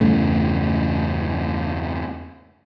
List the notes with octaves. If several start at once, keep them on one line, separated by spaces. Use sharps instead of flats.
E2 G2 C#3 A3